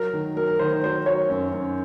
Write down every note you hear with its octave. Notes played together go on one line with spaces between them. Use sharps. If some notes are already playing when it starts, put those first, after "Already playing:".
Already playing: F#3 A#4
D#3
F#3 A#4
A#4
D#3 C5
C5
F#3 C5
F#3 C#5
F#2
F#2